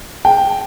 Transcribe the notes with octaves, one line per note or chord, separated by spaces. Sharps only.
G5